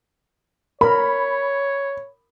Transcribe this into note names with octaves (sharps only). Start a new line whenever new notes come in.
A#4 C#5 B5